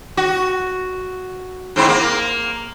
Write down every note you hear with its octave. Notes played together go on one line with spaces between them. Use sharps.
F#4
G#2 C4 E4
A#3